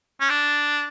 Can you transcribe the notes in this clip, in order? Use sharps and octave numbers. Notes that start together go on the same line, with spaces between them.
C#4
D4